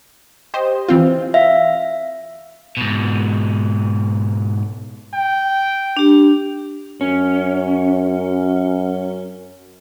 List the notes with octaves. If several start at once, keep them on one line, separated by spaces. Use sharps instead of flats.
G4 C5 D#5
E3 C4 F4
E5 F5
G#2 B2
G5
D4 G4
F#2 C#4